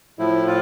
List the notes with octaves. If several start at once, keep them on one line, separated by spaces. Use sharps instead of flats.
A2 F3 E4
F4